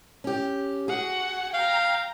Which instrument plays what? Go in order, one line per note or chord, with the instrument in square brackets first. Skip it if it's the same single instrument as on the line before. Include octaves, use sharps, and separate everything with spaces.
[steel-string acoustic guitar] C#4 G4
[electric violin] F#4 F#5 [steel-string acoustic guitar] G#4
[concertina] F5 [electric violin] G5 A#5